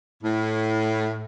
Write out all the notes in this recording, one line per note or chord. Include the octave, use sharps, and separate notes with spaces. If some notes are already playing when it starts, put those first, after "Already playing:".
A2